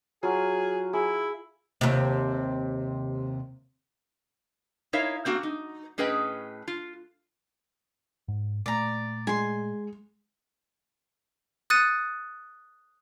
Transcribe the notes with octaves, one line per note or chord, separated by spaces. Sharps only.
F#3 F4 G#4
E4 G#4
D#2 C3
D#4 E4 A#4 C#5 E5 F5
A3 A#3 C4 F#4
D#4
A2 C#4 G#4 B4 D#5 G5
F4
G#2
A#2 A3 D5 A#5
G#3 G#5 C6
D#6 F#6 A6 C#7 D#7